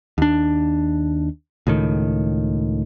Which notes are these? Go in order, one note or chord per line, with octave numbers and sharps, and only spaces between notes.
D#2 D4
C#2 A2 D#3